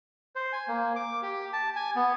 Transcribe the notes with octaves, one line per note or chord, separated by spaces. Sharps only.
C5
G#5
A#3
D6
G4
A5
G#5
B3